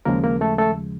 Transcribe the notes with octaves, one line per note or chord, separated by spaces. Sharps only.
D#2 C#3 F3 G#3 A#3 A#4
A#3 A#4
A3 A4
A3 A4